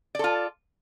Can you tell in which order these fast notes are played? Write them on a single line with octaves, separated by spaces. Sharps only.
D5 A4 F4